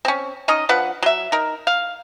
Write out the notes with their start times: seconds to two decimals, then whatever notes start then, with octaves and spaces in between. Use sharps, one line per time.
0.05 C4 C#4
0.48 C#4 D#4 D#5
0.69 F3 D4 B4 F#5
1.02 F#3 E5
1.32 D#4 A#4
1.67 F5